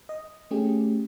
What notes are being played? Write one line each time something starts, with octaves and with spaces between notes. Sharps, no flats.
D#5
A3 C#4 G4 G#4